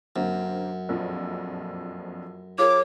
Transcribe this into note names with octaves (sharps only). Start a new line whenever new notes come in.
F#2 D3 A#3 C4
A#1 F2 F3
F4 G#4 A#4 C#5 D6